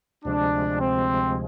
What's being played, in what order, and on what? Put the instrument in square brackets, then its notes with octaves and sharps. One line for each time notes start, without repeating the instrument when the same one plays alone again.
[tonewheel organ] D2 C3 F3 G#3 [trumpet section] D4
[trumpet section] C4